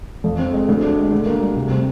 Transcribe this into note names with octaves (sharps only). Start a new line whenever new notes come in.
F2
C4
G#3
D2
D4
G#3
D2
A#3
G3
C3
C4